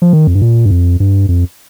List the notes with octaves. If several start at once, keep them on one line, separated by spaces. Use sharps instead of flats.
F3
D#3
F2
G2
A#2
G2
F2
G2
F2